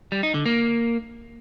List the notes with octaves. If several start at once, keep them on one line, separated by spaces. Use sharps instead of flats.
G3
D#4
D3
A#3